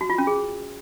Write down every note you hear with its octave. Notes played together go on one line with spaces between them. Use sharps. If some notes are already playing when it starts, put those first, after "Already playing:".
F#4
F4
C#4
G#4